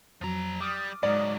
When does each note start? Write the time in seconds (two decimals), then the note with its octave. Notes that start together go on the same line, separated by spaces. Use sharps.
0.21 F2 F3 F#3 A#5
0.60 G3 D6 D#6 F6
1.03 C#2 G#2 F#3 D5